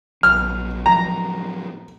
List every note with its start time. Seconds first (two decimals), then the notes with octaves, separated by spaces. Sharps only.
0.23 A#1 F#3 F6
0.86 A2 F3 F#3 A#5